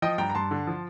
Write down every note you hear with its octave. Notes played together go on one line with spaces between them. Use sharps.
F3 D#5 G5
G2 G5 A#5
A#5
G2 A5 C6
D3
F3